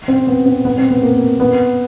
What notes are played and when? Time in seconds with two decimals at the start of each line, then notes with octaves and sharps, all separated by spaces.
0.08 C4
0.27 B3
0.46 C4
0.65 B3
0.78 C4
0.90 B3
1.03 A#3
1.40 B3